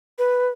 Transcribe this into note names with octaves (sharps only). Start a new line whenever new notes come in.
B4